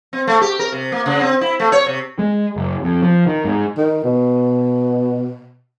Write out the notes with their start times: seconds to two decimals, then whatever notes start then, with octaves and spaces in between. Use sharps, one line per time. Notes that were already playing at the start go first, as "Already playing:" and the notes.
0.13 C4
0.27 A3
0.41 G4
0.59 A#4
0.72 C3
0.92 A#3
1.06 C#3
1.21 C4
1.41 E4
1.60 A3
1.72 C#5
1.86 C3
2.19 G#3
2.56 F#1
2.83 F2
3.02 F3
3.27 D#3
3.45 G#2
3.77 D#3
4.04 B2